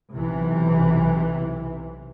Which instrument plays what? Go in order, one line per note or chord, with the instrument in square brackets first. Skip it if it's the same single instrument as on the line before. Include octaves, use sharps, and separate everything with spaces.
[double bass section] B1 C3 E3